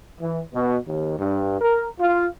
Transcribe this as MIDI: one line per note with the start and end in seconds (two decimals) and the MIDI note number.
0.20 0.40 52
0.53 0.76 47
0.86 1.14 39
1.18 1.57 43
1.60 1.86 70
1.98 2.26 65